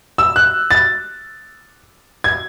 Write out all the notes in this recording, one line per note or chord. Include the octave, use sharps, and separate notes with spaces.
E6
F#6
A6
G#6